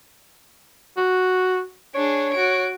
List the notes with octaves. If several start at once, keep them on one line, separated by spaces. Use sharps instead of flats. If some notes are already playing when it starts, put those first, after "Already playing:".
F#4
D4 G#4 C#5
F#4 D7